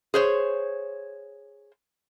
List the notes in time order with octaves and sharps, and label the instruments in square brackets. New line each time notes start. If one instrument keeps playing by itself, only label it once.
[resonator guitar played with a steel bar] G#4 C5 C#5